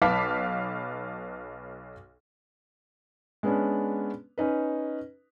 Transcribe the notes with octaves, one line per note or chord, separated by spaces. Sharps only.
B1 B4 F5 A5 D6 B6
G#3 B3 C#4 D4
C#4 D#4 B4